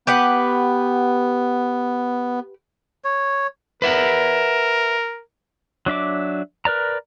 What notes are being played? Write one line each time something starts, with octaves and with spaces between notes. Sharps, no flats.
B3 G4 B4 F#5
C#5
A#4 B4 E5 F#5
F#3 D4 E5 D6
A#4 B4 D5 A#5